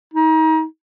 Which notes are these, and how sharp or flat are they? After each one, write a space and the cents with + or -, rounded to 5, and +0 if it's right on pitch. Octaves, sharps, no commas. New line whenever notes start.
D#4 +30